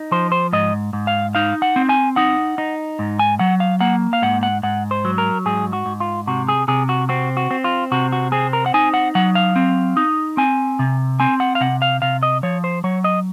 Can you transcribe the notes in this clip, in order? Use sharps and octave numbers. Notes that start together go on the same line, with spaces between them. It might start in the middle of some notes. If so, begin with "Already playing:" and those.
Already playing: D#4
F3 C5
C5
G#2 D#5
G#2
F5
D#4 F5
F#5
C4
G#5
D#4 F#5
D#4
G#2
G#5
F#3 F#5
F5
A#3 F#5
F5
G#2 F#5
F#5
G#2 F#5
C5
F#3
A#4
G#2 G#4
F#4
G#2
F4
C3 F#4
G#4
C3 G#4
F#4
C4 F#4
F#4
C4
F4
C3 F#4
F#4
C4 G#4
A#4
F#5
D#4 G#5
F#5
F#3 F#5
F5
C4
D#4
C4 G#5
C3
C4 G#5
F#5
F5
C3 F#5
F5
C3 F5
D#5
F3 C#5
C5
F#3 C#5
D#5